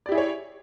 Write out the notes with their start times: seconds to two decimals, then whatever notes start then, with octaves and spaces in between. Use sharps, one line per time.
0.06 D5
0.09 G4
0.12 E4
0.15 G#4
0.18 C#5